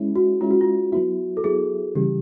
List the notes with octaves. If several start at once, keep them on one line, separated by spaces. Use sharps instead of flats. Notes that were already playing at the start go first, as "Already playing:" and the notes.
Already playing: G#3 C#4 E4
F#4
G#3 C#4 E4 F4
F#4
F4
F#3 B3 E4 F#4
A4
F#3 B3 E4 G#4
C#3 E3 G3 G4